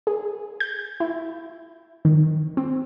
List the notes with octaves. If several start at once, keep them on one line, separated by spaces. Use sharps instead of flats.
G#4
G6
E4
D#3
C4